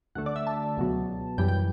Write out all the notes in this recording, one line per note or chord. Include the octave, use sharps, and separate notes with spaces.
D2 D3 A3 F#5
D5
E5
A5
C#2 B2 F#3
F#2 E3 G3 G5
G5